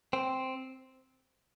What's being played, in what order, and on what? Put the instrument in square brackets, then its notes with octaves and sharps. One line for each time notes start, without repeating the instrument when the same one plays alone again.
[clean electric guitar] C4